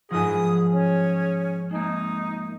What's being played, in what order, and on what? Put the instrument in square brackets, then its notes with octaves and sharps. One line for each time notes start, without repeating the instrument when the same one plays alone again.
[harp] G#2 F3 [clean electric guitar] F#3 F4 G#5 [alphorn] G#4 [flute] D#6
[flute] C#4
[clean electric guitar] G#3 A#3 [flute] D#4